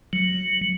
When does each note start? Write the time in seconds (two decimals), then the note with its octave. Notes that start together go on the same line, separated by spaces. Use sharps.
0.13 F#3